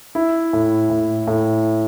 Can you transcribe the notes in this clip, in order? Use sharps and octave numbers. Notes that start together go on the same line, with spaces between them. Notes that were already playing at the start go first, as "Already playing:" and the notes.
E4
A2
A2
A2